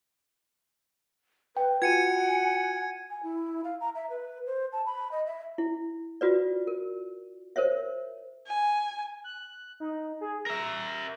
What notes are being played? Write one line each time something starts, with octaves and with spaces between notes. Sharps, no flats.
B4 G5
F4 F#4 F#5 G#5 G#6 C#7 D#7
G#5
E4
F5
A#5
E5
B4
C5
A5
B5
D#5
E5
E4
F4 F#4 B4 D5
A#4
A#4 C5 C#5 E5
G#5
F#6
D#4
G#4
A#4 E5 A#6